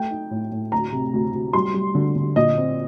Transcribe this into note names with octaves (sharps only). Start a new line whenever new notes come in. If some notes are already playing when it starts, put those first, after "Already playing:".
Already playing: A3 G5
D#4
A2
A2
D2 A#5
C3
D2
D2
G3 C6
G3
D3
D3
A#2 D#5
C4